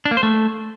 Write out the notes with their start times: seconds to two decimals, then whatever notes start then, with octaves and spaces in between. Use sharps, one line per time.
0.05 D4
0.11 A#3
0.17 C5
0.23 A3